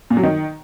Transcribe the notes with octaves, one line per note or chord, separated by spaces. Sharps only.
A#2
F#3
D#3